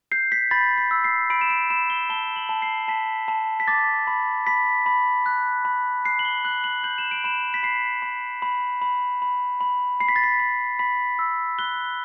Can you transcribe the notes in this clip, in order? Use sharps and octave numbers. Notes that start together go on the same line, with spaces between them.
G6 C7
B6
B5 A6
B6
E6
C7
B5 D7
E7
D7
B5 E7
G7
A5 G7
F#7
A5
C7
A5 B6
A5
B6
D6 A6
B5
B5 B6
B5
F#6
B5
F#6 C7
F#7
G7
F#6 F#7
F#7
G6 F#7
E7
D7
B5 E7
B6
B5 C7
B5
B5
B5
B5
B5
B5 C7
B6
A6
B6
B5
B5 B6
E6
F#6 G7